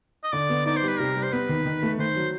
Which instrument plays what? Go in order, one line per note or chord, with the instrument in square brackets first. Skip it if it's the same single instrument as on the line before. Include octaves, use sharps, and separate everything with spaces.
[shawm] D#5
[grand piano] D3 [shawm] D5
[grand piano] B3
[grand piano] D#4 [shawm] D5
[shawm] C5
[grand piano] G3
[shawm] B4
[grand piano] C3 [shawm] A#4
[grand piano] G3
[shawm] C5
[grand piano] B3 [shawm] B4
[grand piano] D#3
D#3
A3
[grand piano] D#3 [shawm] C5
[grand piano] F#3